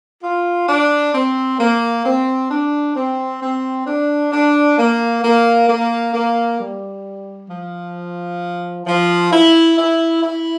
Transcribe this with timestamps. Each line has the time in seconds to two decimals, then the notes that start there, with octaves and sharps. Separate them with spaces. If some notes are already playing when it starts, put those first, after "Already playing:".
0.24 F4
0.69 D4
1.14 C4
1.59 A#3
2.05 C4
2.50 D4
2.96 C4
3.41 C4
3.86 D4
4.32 D4
4.78 A#3
5.23 A#3
5.68 A#3
6.14 A#3
6.59 G3
7.50 F3
8.87 F3
9.32 E4
9.78 E4
10.23 E4